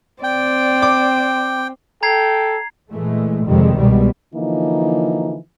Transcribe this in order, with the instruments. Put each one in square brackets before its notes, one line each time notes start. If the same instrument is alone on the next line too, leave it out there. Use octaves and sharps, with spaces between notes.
[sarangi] C4 [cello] D5 [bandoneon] G5
[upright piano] D6
[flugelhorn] A4 [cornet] G5 [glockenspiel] A#5 G#6 C7
[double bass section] A#2 E3 G#3 A3
F2 C3 D#3 G3 G#3
C2 B2 G3 G#3
[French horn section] D3 E3 F3 A#3 D#4